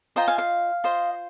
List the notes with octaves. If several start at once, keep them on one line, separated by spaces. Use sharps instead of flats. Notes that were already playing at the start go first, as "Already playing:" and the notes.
F4 C5 D#5 G5 A#5
F5 G#5
F5
F4 C5 D#5